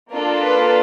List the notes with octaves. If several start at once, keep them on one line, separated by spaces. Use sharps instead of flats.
A#3 D4 F4 A4 A#4
B4